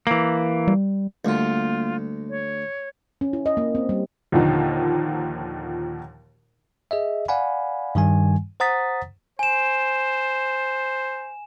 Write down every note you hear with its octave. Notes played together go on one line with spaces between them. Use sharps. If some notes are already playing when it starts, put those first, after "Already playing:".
E3 A#3
G3
D2 G3 A#3 F4
C#5
C#4
E4
D#5
A#3
C4
G3
D#2 A#2 D3 F3 D#4
G#4 D#5 E5
D5 F5 F#5 G#5 B5
G2 D#3 G3 G#5
C5 F#5 A#5 D#6 A6 B6
C5 G#5 E7